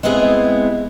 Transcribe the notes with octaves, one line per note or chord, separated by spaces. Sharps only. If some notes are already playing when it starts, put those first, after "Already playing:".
G#3 B3 C4 E4 G#4